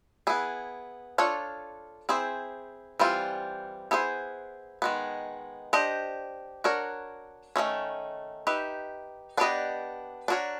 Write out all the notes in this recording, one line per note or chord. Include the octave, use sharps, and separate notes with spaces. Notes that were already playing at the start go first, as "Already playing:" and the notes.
B3 E4 G#4
D4 F4 A4 C#5
C4 E4 G#4 C5
E3 G3 C4 F4
B3 E4 G#4 C5
D#3 G#3 B3
D4 G4 C5 D#5
D4 F#4 A#4 C#5
D#3 F#3 A3 C#4
D#4 G4 B4 E5
B3 D4 G4 B4 D#5
D4 F#4 A#4 C#5